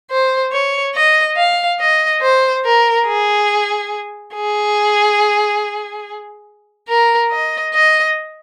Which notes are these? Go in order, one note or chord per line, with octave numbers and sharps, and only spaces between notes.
C5
C#5
D#5
F5
D#5
C5
A#4
G#4
G#4
A#4
D#5
D#5